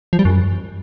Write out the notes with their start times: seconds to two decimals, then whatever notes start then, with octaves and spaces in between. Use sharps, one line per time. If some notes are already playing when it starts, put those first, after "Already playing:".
0.13 F3
0.19 G3
0.25 F#2